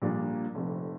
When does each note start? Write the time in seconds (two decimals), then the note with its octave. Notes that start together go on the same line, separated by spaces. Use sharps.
0.02 A#1 A#2 G3 A#3 D4
0.55 F1 F2 C3